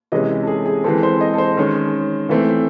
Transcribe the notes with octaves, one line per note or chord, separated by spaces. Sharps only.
C3 E3 G#3 C#4 D#5
A4
G#4
G#4
E3 G#3 C4 A4
C5
D#5
A4
C5
D#3 G#3 C#4
E3 A3 C4